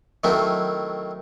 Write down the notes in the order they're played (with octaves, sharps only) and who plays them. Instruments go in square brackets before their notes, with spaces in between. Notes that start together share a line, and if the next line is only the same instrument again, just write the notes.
[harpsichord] D#3 F#3 A3 C4 E4